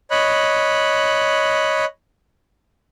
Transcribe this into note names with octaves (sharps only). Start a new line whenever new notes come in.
C#5 D#5 B5 F#6